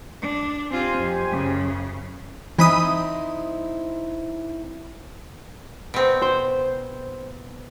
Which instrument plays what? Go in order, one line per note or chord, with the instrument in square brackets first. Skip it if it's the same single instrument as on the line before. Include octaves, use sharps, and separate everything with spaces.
[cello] D4
[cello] C4 F4 [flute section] G4 C5 G#5
[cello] F2
F#2 C#3
[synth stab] E3 B5 D#6 [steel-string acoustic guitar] C4 D#4 E4
[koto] B2 C4
[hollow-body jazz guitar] C5